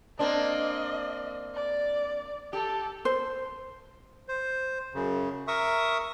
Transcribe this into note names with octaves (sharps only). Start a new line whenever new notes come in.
A#3 C4 D4 D#5
D5
G4 A4
C5
C5
F#2 C#3
A#4 E5 C#6 D#6